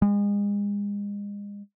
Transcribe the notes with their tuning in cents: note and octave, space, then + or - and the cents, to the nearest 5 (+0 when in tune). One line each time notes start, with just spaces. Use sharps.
G#3 -35